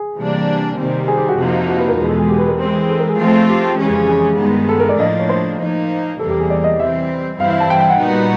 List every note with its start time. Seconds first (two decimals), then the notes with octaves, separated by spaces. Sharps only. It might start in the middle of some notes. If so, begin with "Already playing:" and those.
Already playing: G#4
0.18 C3 E3 G3 A#3 D4
0.79 C3 D#3 G3 C4
1.08 G#4
1.18 G4
1.29 F#4
1.39 F2 C3 F3 A#3 D#4
1.69 F#4
1.78 B4
1.88 A#4
1.98 E2 B2 G#3 B4
2.08 A4
2.19 G#4
2.29 G4
2.38 B4
2.48 A#4
2.59 E3 G#3 C4
2.89 A4
2.99 A#4
3.09 G#4
3.18 F3 A3 C4 F4
3.49 G4
3.79 F2 C#3 E3 G#3 C#4
4.08 G#4
4.39 G2 D#3 G#3 B3
4.69 A4
4.80 A#4
4.89 D5
4.99 A2 F3 A#3 D4 D#5
5.19 C#5
5.29 C5
5.60 F3 A#3 D#4
6.19 E2 C3 E3 G3 A#3 A4
6.30 G4
6.40 G#4
6.50 D5
6.64 D#5
6.79 E3 G3 C4 E5
7.40 G2 E3 G3 C4 E4 F5
7.50 F5
7.60 A5
7.70 G5
7.80 G5
7.90 F#5
8.00 A#2 G3 B3 D#4 F#4